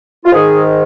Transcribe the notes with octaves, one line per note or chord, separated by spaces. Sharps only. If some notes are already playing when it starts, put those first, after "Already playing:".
F4
G#2 D#3 G#4